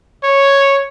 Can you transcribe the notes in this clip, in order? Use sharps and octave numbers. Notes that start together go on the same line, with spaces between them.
C#5